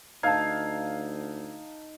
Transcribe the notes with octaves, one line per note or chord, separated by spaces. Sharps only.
D2 D#4 F5 A5 E6 G#6